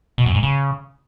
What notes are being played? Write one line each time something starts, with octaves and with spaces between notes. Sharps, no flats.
B2
F#2
G#2
C#3